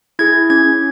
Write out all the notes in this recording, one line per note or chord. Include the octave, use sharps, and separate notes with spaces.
E4 G#4 G#6
C#4 G#6